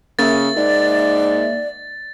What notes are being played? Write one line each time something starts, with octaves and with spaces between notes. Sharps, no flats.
C#3 A#3 E5 A6
G#2 D5